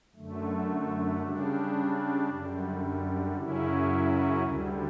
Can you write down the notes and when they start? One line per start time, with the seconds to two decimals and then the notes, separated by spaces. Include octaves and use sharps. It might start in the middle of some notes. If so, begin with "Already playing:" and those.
0.15 F#2 D3 A3
1.22 C#3 G3 D4
2.29 F#2 D3 G3
3.37 F#2 C#3 F#3 C#4 E4
4.43 D2 D3 G3